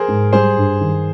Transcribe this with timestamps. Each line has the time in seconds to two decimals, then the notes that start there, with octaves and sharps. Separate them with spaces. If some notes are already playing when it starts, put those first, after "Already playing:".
Already playing: G#4 A#4 C5
0.08 G#2
0.32 G3 G#4 C5
0.57 G2
0.81 D#3